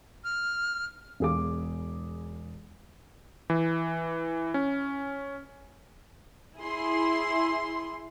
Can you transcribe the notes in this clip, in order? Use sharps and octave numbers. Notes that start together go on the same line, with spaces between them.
F6
E1 G#4 D6
E3
C#4
E4 G#4 C6